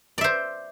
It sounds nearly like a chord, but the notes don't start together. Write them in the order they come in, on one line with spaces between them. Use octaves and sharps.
D5 E5 C5